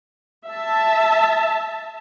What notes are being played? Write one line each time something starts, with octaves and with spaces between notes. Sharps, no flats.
E5 A5